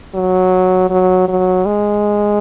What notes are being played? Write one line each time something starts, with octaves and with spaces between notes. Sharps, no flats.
F#3
F#3
F#3
G#3